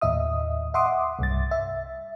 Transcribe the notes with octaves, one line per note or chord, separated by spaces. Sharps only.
D#2 A2 D#5 E5 D#6
E5 F#5 C6 D6 D#6
C2 G2 A6
E5